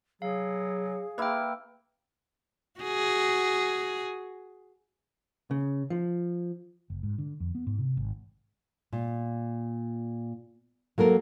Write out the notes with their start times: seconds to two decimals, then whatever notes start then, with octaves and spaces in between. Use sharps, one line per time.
0.22 F#3 G#4 F5
1.18 A#3 E4 B4 G5
2.80 F#4 G#4
5.51 C#3
5.90 F3
6.90 F#1
7.03 G#2
7.18 D3
7.40 F2
7.55 B3
7.67 G#2
7.78 C3
7.97 G#1
8.93 A#2
10.98 F#3 A#3 A4 A#4